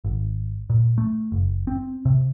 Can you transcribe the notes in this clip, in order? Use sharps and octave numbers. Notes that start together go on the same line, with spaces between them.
G#1
A#2
A3
F#1
C4
C3